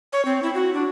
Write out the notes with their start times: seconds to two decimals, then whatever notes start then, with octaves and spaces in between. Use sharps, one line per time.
0.13 C#5
0.25 C4
0.43 E4
0.54 F#4
0.74 D4